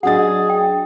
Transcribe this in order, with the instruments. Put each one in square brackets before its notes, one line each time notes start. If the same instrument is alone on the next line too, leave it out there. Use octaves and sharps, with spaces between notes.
[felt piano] F#3 D4 A6 [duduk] G#4 [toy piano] D#5 F#5
[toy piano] G5